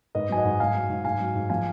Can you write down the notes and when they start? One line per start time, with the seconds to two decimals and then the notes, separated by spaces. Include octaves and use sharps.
0.15 G#2 B4 D#5
0.29 F#3 G#5
0.37 D#5 F#5
0.45 G#2
0.60 G#2 F5 G#5
0.75 F#3
0.90 G#2
1.05 G#2 F5 G#5
1.20 F#3
1.35 G#2
1.50 F3 F5 G#5